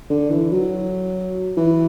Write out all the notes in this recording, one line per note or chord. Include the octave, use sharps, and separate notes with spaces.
D3
E3
F#3
E3